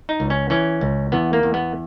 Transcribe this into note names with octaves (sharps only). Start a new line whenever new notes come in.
D#4
C#2
C#4
E3 C#4
C#2
E2 B3
A#3
E2
B3